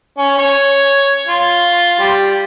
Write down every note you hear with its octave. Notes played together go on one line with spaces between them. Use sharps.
C#4
C#5
F4
G3